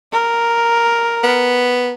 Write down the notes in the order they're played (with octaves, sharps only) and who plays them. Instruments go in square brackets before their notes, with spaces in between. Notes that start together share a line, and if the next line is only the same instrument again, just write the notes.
[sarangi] A#4
[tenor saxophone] B3